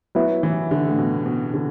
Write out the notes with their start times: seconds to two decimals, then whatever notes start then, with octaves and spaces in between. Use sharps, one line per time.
0.15 F#3 B3 E4 B4 E5
0.43 E3
0.71 D3
0.88 A2
0.98 B2
1.26 B2
1.54 D3